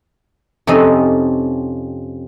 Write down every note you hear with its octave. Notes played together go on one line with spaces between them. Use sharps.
F2 C3 F3 C#4 D#4 D#5